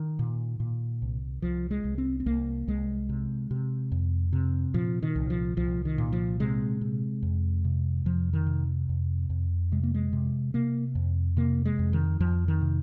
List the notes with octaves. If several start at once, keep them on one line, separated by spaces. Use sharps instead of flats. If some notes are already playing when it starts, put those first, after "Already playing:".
Already playing: D#3
A#2
A#2
C2
C2 F3
G#3
C2
C4
C4
C2 A#3
C2 G#3
C3
C3
F2
C3
A#2 F3
D#3
C2
F3
C2 F3
D#3
A#2
F3
C3 G#3
C3
F2
C3
F2 F3
D#3
C3
F2
F2
C3 G#3
A#3
G#3
C3
C3 A#3
F2
C3 A#3
G#3
F2
D#3
F2 F3
D#3
C3